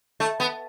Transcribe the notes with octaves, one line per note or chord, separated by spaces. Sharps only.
A3
B3